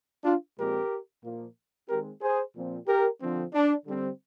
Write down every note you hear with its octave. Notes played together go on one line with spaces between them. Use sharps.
D4 F4
A#2 F3 G#3 C4 G4 A#4
A#2 F3 A#3
D#3 G#3 C4 G4 A#4
G#4 C5
A#2 F3 C4
G4 A#4
D3 F3 C4
D4
D3 G3 C4